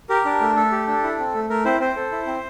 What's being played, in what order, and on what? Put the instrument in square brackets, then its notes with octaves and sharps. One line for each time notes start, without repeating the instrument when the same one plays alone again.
[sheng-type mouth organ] G4 A#4
D4
A3
A3 A4
G4
D4
E4
C4
A3
A3 A#4
C4 E4 C5
C4 C5
A4
E4
C4